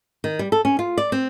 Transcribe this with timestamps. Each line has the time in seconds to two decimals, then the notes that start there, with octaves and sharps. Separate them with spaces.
0.24 D#3
0.39 G3
0.52 A4
0.65 C#4
0.79 F4
0.97 D5
1.12 C4